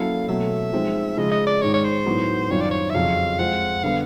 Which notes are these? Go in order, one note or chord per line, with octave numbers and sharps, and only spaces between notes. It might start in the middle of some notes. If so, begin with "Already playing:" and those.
Already playing: F#3 A#3 C#4 E4 A4 F5
B2 F#3 A3 E5
F3 G#3 C4 D#4
C#3 F3 G#3 D#5
D#5
D5
G#2 D#3 G#3 C#5
C#5
C5
A2 F#3 B3 D#4
F#2 D#3 G3 C4 F4 C#5
D5
C#5
E5
F2 C#3 F#3 F5
F3 G#3 C4 F4 F#5
D3 G3 B3 F5